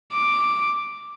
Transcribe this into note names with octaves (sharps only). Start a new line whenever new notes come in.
D6